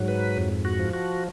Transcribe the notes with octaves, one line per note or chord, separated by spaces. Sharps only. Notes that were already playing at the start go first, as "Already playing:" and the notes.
Already playing: G#2 F#3
B4
F2
F#4
F3
F#4